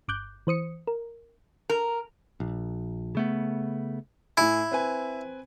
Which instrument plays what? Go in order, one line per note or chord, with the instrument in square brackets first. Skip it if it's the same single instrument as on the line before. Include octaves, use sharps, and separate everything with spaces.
[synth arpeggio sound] G1 D6 F#6 G6
E3 C5 D#6 C#7
A#4
[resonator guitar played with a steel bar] A#4
[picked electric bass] A#1
C#3 A3 B3
[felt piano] A2 G#5 [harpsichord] E4
[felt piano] C4 B4 G#5